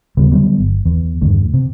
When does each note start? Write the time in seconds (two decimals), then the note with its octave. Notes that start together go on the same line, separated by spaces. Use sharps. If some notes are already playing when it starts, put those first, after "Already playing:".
0.17 D#2 C#3 G3 B3
0.31 D3 F#3 G3 B3
0.58 G1
0.86 E2
1.21 E2 G2 D3 A3
1.54 C3